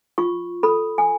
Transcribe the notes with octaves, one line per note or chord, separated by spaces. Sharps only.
F4 C#6
A4 B5
G#5